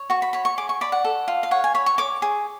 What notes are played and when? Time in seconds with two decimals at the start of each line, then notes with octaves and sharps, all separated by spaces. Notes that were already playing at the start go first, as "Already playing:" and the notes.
Already playing: C#5
0.10 F#4 C#6
0.22 B5
0.33 C#5 B5
0.45 C#6
0.58 G#4 D6
0.69 C#6
0.81 D5 B5
0.92 F#5
1.04 A4
1.28 F4
1.43 F5
1.51 C#5 F#5
1.64 G#5
1.75 C#5 B5
1.86 C#6
1.98 C#5 D6
2.22 G#4